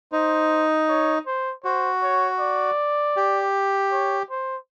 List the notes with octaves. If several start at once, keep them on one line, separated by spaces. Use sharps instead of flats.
D#4 C5
C#5
C5
F#4 C5
C#5
D5
G4
C#5
C5